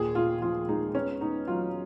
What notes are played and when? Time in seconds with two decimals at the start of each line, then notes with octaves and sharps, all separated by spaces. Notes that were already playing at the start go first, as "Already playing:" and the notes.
Already playing: D#2 A#2 G#4
0.15 A#2 F4
0.42 F3 F4
0.68 G#3 D#4
0.95 B3 C#4
1.21 B3 D#4
1.47 F#3 F4